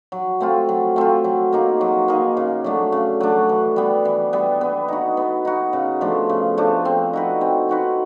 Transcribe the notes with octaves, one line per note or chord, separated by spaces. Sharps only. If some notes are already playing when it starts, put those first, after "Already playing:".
F#3
A3 C4 F4
F#3
A3 C4 F4
F#3
A#3 D#4 G#4
F#3
A#3 D#4 G#4
C#3
F#3 A3 D4
C#3
F#3 A3 D4
E3
G3 B3
E3
G3 B3
B3
D#4 F#4
B3
D#4 F#4
C#3
F3 A3 D4
C#3
F3 A3 D4
C4
D#4 F#4 B4
C4
D#4 F#4 B4